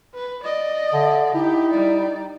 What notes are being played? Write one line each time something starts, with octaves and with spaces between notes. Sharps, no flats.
B4
D5 D#5
D3 E5
D#4 E4 G4
G3 D5